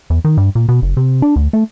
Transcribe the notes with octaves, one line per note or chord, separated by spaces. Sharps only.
E2
D#3
G2
A#2
B2
F#1
C3
D4
D2
A3